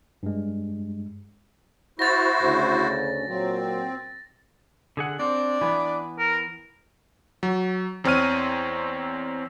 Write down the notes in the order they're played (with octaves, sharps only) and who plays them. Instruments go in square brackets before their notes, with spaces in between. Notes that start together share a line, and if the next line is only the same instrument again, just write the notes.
[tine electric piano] G2 G#3
[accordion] E4 F#4 C5 [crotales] A6 A#6
[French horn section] D2 C#3
[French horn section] A#2 F#3 [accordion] C4
[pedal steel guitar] D3 G#4 F#5
[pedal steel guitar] C4 C5 [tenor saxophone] D4
[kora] E3 B3 [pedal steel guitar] B4
[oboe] A#4
[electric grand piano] F#3
E2 C4 C#5 F6 D#7